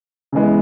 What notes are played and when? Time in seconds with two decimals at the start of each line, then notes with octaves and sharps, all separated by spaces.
0.32 C#3 E3 G#3 B3